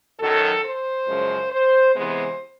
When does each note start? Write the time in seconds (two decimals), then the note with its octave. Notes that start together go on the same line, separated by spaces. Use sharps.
0.20 F#2 D#3 F#3 A4
0.64 C5
1.07 F#2 C#3 F3 G#3
1.51 C5
1.96 C3 E3 G#3 B3 C5